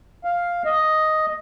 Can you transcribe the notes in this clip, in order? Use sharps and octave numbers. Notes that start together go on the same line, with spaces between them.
F5
D#5